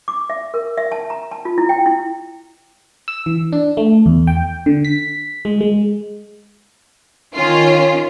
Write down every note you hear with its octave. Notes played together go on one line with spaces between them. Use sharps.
D6
E5
A#4
E5
A5
A#5
A5
F4
E4
G5
E4
E6
E3
D4
A3
E2
G5
D3
B6
G#3
G#3
D#3 C#4 F4